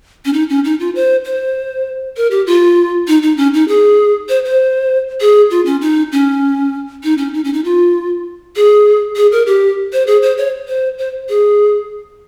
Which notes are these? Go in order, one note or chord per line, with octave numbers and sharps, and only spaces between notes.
C#4
D#4
C#4
D#4
F4
C5
C5
A#4
G4
F4
D#4
D#4
C#4
D#4
G#4
C5
C5
G#4
F4
C#4
D#4
C#4
D#4
C#4
D#4
C#4
D#4
F4
G#4
G#4
A#4
G4
C5
G#4
C5
C#5
C5
C5
G#4